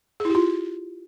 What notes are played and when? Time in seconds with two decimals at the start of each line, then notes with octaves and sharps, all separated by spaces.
0.20 G#4
0.25 E4
0.30 G4
0.35 F4